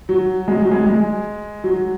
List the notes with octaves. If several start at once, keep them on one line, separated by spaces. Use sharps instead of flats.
F#3
G#3
F#3
G#3
G#3
F#3